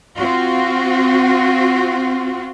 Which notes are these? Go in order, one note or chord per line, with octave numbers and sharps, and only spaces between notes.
C4 F4 F#4